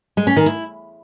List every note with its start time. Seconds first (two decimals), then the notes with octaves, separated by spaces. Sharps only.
0.17 G#3
0.27 C#4
0.37 D#3
0.46 E4